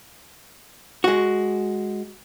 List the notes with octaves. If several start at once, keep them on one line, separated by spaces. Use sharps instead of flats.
G#3 F#4